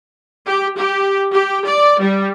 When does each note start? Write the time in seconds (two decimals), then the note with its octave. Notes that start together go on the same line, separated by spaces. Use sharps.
0.46 G4
0.78 G4
1.33 G4
1.67 D5
2.01 G3